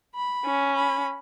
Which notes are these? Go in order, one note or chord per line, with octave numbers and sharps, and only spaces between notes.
B5
C#4
B5